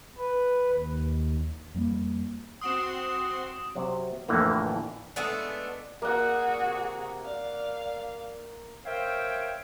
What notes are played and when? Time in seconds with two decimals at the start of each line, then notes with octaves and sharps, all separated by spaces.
0.18 B4
0.71 D#2
1.74 F2 G3 A3 A#3
2.61 C4 F#4 C6 D#6 D7 E7
3.75 C3 F#3
4.28 A1 F2 A2 D3 E3 A#3
5.16 G#3 A3 B3 D4
6.02 A#3 F#4 G#4 D5 F#5
6.62 C3
7.25 D5 F5
8.85 A#4 C5 C#5 E5 F5 G5